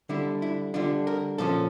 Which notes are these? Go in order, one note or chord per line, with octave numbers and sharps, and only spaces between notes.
D3 G3 D4 E4
E4
D3 G3 D4 F4
A#4
A#2 F3 C#4 A4